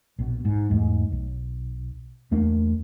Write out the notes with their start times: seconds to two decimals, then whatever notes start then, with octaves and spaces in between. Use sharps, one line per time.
0.19 A#1 B2
0.45 G#2
0.70 E2 G#2 A3
1.12 B1
2.31 E2 A3 A#3 D4